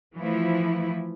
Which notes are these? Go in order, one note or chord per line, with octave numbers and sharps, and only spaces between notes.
E3 F3 A3 E4